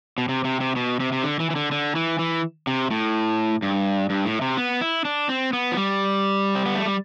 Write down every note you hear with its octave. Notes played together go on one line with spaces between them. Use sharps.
B2
C3
C3
C3
B2
C3
C3
D3
E3
E3
D3
D3
E3
E3
C3
A2
G2
G2
A2
C3
B3
E4
D4
C4
B3
F3
G3
C4
B3
A3
G3